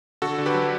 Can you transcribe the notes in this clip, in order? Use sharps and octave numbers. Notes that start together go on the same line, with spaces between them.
D3 F#4 A4
D3
G4 B4
F#3